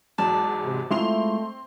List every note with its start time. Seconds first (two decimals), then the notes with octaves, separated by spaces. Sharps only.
0.18 E2 G#2 F#3 D5 A5
0.64 C3
0.91 G#3 A3 C4 E4 F4 C6 F7